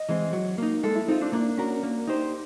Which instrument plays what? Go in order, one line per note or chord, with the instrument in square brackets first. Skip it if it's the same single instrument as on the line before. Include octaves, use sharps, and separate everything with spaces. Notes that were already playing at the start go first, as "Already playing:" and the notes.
Already playing: [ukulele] D#5
[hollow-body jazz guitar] E3 G#3 C4
F#3
A#3 D#4
[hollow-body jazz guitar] G#3 [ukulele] A4
[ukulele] E4
[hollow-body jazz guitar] C4 F4 [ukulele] D#4
[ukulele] D4
[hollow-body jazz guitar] A#3 [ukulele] D4
[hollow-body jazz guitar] C#4 F#4 A#4
A#3
D#4 G4 C5